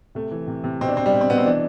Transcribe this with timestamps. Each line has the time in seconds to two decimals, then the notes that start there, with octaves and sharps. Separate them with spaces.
0.15 C3 A3
0.31 E3
0.47 C3
0.64 C3
0.81 B2 C4
0.88 D4
0.97 B2 C4
1.06 G3
1.13 B2
1.21 C4
1.29 B2 B3
1.38 C4
1.46 E3 D4